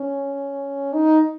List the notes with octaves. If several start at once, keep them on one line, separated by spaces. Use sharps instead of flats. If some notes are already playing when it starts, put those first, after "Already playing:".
Already playing: C#4
D#4